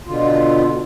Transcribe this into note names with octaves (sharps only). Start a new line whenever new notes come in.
B2 D3 F4